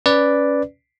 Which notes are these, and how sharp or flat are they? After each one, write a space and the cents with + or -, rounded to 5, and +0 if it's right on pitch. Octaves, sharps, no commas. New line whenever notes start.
C#4 +10 B4 +0 D5 +0